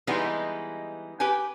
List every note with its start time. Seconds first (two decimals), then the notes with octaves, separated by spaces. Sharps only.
0.07 E3 G3 G#3 B3 C4 D#4
1.20 G4 B4 G5 G#5